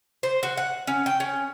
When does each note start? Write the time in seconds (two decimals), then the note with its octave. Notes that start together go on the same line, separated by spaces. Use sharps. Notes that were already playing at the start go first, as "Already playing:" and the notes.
0.23 C5
0.43 F#4
0.57 F#5
0.87 C#4
1.06 G5
1.20 C#4